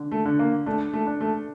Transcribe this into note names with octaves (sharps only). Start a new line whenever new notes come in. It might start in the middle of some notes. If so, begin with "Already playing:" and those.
Already playing: D3
A3
D3
A#3
A3 D4
A3
D4
A3